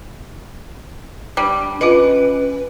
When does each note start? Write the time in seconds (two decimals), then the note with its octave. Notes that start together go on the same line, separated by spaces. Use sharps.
1.37 G3 D4
1.81 C#4 F4 B4 D#5